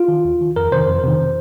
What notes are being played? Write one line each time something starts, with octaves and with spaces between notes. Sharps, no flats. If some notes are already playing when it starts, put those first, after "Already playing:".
Already playing: F4
D#3
D#2
D#3
F2 A#4
C3 D#3 C5
F2
C3 D#3